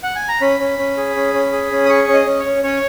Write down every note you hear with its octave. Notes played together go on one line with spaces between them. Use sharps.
F#5
G#5
A#5
C#4 B5
C#4
C#4
G#4
C#4
C#4
G#4
C#4
D#6
G#4 C#6
C#4
D#5
C#4
C#5
C#4
C#4 C#5